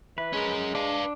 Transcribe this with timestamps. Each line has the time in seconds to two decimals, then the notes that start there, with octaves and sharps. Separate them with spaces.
0.18 E3 B4
0.33 G#3 C#4 A#4
0.75 D4 B4 F5